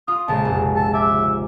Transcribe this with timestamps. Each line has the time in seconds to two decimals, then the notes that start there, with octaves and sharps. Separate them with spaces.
0.08 F4 D#6
0.28 A#1 C#3 G#3 A5
0.45 F1
0.76 A5
0.94 E5 D6